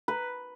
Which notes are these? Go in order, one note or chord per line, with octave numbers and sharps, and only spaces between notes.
B4